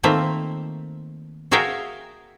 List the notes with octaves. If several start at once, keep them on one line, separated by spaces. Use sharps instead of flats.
D#3 A3 A#3 C4 F4 E5
F#4 G#4 A#4 E5 F5 G5